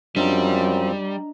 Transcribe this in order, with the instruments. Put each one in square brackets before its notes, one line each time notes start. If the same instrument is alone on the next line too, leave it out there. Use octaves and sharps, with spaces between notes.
[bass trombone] F#2 [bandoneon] F3 C4 [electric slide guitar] G3 [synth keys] D4 D#5 A#5